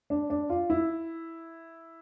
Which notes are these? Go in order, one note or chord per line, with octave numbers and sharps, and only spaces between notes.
D4
D4
F4
E4